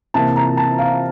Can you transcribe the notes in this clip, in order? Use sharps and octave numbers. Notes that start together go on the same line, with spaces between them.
C3 E3 A#3 A5
A#5
A5
F5